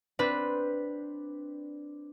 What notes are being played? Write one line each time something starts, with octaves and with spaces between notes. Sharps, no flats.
C4 D4 B4